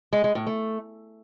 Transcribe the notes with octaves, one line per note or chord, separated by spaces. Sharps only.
G#3
G#3
A2
A3